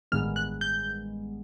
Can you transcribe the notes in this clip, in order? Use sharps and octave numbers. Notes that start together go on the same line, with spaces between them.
A1 G2 D#3 G#3 B3 F6
F#6
G6